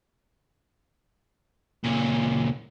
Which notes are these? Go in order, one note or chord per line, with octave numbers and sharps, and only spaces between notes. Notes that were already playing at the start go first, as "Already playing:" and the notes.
A#2 C#3